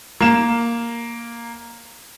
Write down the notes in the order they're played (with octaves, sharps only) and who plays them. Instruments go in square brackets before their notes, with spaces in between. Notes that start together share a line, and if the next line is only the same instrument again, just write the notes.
[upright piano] A#3 E7